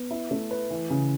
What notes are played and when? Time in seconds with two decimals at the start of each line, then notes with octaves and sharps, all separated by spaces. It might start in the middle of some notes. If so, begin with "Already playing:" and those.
Already playing: B3
0.11 E4
0.31 A3
0.51 B4
0.70 E3
0.90 C#3